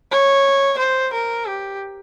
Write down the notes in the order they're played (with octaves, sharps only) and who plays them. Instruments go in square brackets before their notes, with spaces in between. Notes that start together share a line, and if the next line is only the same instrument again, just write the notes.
[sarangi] C#5
C5
A#4
G4